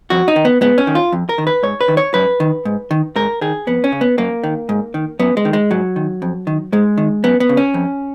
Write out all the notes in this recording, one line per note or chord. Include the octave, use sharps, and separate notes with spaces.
F2 F#4
D#4
D#3
B3
G#2 B3
C#4
D#3
F4
F2
A#4
D#3
B4
G#2 C#5
B4
D#3
C#5
F#2 B4
D#3
G#2
D#3
G#2 A#4
D#3 G#4
F2 B3
C#4
C#3
B3
F#2 A#3
D#3
G#2
D#3
F#2 B3
G#3
D#3
G#3
G#2 F#3
D#3
F2
D#3
G#2 G#3
D#3
F#2 B3
B3
C#3
C#4
F2